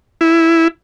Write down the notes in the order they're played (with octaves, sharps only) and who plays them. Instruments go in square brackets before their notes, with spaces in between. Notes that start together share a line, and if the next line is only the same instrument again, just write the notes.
[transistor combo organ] E4